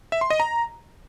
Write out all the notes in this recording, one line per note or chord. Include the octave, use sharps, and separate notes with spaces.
E5
C6
D#5
A#5